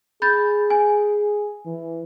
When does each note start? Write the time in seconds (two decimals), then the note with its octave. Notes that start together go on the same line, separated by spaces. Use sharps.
0.22 G#4 B5 G6 A6
0.70 G#5
1.66 E3